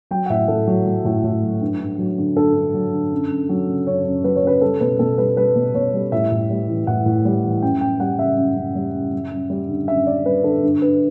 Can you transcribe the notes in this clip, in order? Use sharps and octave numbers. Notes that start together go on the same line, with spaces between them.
F#3 G5
F#5
A2 E5
A2 A4
F#3
F#3
A2
A2
F#3
G2
G2
F#3
D3
G2 A4
G2
F#3
D3
F#2
F#2
F#3
C#3
F#2 C#5
F#2
F#3 B4
C#5
C#3 B4
G3 A4
B2 B4
B2 A4
G3 B4
G3 B4
B2
B2 C#5
G3
A2 E5
A2
G3
E3
A2 F#5
A2
G3
E3
F#2 G5
F#2 G5
G3 F#5
C#3 E5
F#2
F#2
G3
C#3
F#2
F#2
G3
D3
F#2 E5
F#2 D5
G3 B4
D3 A4
G2
G2 B4